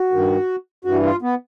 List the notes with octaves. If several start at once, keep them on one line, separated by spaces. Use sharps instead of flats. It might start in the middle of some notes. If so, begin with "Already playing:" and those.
Already playing: F#4
G2 D#3
G2 E3 F#4
F4
B3